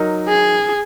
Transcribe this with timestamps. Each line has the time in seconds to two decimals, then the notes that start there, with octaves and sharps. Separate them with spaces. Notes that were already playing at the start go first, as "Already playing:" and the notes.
Already playing: F#3 D#4 A#4
0.29 G#4